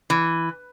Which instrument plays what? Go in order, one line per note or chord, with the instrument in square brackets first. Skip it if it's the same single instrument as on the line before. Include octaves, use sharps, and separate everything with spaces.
[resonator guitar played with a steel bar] E3